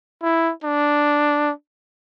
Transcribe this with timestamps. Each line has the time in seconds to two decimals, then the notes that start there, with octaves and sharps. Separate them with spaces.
0.23 E4
0.64 D4